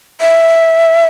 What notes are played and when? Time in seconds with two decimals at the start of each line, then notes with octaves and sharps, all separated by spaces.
0.21 E5